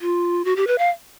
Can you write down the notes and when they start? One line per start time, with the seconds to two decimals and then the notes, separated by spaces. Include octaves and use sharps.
0.01 F4
0.45 F#4
0.56 G4
0.67 B4
0.78 F5